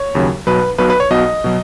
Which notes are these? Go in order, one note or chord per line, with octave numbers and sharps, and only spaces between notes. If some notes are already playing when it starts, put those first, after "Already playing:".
Already playing: C#5
D#2 C#3 F#3
B1 B2 F#3 B4
B1 B2 F#3 B4
B4
C#5
B1 B2 F#3 D#5
B2 F#3